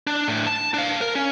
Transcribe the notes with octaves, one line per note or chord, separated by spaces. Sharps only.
D4
A2 D4
A5
D4 F5
A#4
C#4